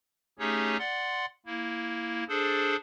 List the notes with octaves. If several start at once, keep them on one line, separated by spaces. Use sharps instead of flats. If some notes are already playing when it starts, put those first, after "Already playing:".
A3 C#4 D#4 G4 G#4 C#5
D5 F#5 C6
A#3 E4
D4 G#4 A4 C5